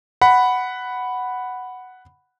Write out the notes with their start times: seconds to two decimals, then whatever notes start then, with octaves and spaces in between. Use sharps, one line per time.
0.22 F#5 B5